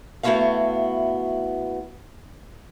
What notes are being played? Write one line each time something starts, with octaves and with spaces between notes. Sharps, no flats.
A3 B3 E4 F#4 E5 F5